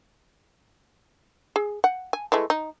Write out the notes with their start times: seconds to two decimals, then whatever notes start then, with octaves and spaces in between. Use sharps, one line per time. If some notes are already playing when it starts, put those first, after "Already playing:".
1.56 G#4
1.84 F#5
2.13 G#5
2.32 E3 G#3 A3
2.50 D#4